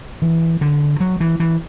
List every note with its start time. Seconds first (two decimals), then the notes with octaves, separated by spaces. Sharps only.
0.22 E3
0.61 D3
1.00 F#3
1.20 E3
1.40 E3